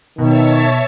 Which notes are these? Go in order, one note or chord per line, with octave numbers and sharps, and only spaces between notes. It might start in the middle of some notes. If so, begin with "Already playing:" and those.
B2 D#3 C#5 E5 A5